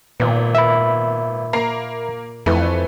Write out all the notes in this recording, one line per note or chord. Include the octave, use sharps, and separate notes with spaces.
G#1 A#2 B3
E5 B5
A#3 A#5 C7
F2 E3 A3 B4